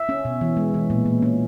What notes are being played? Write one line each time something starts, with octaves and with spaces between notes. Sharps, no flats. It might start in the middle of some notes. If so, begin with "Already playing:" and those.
Already playing: E5
C#4
B2
E3
G#3
E3
A#2
A#2
C#4